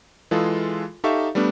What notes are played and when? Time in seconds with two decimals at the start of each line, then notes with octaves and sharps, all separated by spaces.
0.31 E3 G#3 F4 G#4 A4
1.04 D#4 G4 A4 E5 F5 C#6
1.35 G3 A3 B3 D4